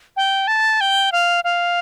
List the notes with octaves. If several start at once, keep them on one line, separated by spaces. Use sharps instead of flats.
G5
A5
G5
F5
F5